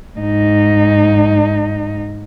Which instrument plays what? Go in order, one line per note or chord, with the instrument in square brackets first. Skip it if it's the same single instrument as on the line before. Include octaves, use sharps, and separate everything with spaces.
[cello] G#2 D#4